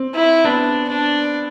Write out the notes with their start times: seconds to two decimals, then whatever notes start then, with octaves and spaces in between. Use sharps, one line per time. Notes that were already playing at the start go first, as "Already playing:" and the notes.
Already playing: C4
0.15 E4
0.44 B3 D4
0.89 D4